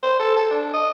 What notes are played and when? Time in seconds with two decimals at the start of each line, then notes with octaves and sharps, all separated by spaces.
0.03 C5
0.19 A4
0.37 A4
0.50 D4
0.74 D#5